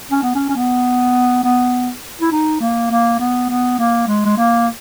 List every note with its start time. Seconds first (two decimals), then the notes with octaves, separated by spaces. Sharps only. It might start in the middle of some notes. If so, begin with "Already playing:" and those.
0.11 C#4
0.23 B3
0.35 C#4
0.49 C#4
0.56 B3
1.44 B3
2.22 E4
2.32 D#4
2.61 A#3
2.91 A#3
3.20 B3
3.49 B3
3.79 A#3
4.07 G#3
4.26 G#3
4.38 A#3